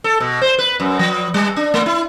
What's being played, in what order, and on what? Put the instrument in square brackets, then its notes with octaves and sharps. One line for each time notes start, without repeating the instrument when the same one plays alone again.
[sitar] A4
B2
C5
B4
F#2
F3
G3
D4
A3
E4